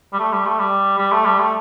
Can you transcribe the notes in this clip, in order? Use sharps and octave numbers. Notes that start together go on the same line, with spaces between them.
G3
A3
G3
A3
G3
G3
A3
G3
A3